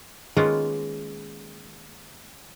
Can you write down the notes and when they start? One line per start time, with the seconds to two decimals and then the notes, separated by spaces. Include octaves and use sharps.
0.37 D#3 G#3 A#3 B3 C#4 F4